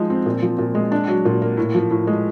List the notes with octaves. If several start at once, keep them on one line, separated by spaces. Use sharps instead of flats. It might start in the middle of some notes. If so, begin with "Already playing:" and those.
Already playing: F3 G#3 D#4
C4
A#2
F3
A#2
G#3
D4
F#3
A#2
A#3
A2
F3
A2
G#3